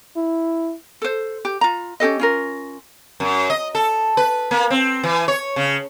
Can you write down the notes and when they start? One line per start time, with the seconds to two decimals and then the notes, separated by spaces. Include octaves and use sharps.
0.16 E4
1.02 A4 C5
1.45 G4
1.61 F4 A#5
2.00 C#4 G4 A4 D#5
2.19 C#4 F4 A#4
3.20 F#2
3.50 D#5
3.75 A4
4.17 B4
4.51 A#3
4.70 C4
5.03 E3
5.28 C#5
5.56 C#3